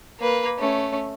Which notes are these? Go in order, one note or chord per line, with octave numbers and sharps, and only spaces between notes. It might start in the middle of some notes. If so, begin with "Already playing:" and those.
A#3 B4
A3 C#4